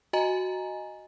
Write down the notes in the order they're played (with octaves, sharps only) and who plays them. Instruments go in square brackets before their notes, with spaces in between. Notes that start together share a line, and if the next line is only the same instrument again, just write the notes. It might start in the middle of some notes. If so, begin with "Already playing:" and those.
[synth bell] F#4 D#5 G#5 A#5